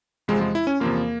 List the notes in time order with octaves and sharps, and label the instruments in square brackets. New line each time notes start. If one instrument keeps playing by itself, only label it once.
[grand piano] E2 C3 F3 C4 F4 [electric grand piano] G#3
[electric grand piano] G#3
E4
C#4
[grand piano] E2 C3 F3 C4 F4 [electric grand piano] A#3